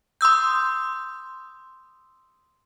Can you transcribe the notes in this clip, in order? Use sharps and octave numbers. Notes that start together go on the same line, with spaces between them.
C6 D#6 E6 G6